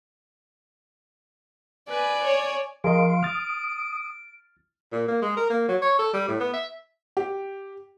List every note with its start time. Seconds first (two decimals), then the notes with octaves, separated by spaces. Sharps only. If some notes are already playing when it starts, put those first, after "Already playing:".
1.89 B4 D5 G#5
2.25 C#5
2.84 F3 G#4 A#4 D#5 F5 C6 D7
3.23 D#6 F6 A6
4.92 A#2
5.08 A#3
5.22 G#3
5.37 A#4
5.50 A#3
5.68 F#3
5.82 C#5
5.99 A4
6.13 G3
6.28 A2
6.40 B3
6.53 E5
7.17 G4